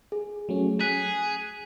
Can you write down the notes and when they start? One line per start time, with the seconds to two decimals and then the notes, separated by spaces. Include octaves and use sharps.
0.12 G#4
0.49 F#3 A3 C#4
0.81 G#4 F#6 B6